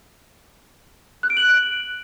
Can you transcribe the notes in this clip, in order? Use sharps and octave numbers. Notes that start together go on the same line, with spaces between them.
F#6
D7
F#7